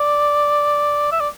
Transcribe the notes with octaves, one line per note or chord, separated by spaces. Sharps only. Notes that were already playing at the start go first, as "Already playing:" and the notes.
Already playing: D5
E5
D5